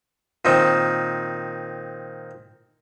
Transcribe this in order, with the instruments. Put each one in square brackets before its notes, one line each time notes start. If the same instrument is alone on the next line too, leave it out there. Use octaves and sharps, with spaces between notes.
[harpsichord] A#2 D#3 C4